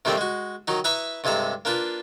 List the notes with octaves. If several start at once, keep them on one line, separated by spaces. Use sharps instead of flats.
C3 D#3 G3 A3 A#3 C4
G#3 F#4
D#3 F#3 D#4
E4 B4 A#5 B5 C#6 D#6
G2 C3 G#3 A4 A#5
A#3 D4 F4 B4